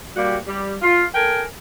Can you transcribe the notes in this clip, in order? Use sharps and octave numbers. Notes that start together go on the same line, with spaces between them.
G3 A#3 F#4 G4
G3
F4
A4 A#4 G5 G#5